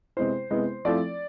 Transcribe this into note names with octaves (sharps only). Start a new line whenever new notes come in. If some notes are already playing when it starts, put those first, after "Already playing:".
C3 G#3 B3 E4 C5
C3 G#3 B3 E4
F3 A3 C4 E4 D5